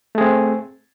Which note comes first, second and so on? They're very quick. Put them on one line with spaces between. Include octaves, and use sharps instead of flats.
A3 G#4 C4